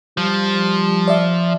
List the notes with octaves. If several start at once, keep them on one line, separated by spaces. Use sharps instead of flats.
F3 G3
D5 E5